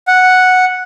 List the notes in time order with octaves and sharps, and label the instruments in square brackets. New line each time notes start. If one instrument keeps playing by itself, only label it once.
[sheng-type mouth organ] F#5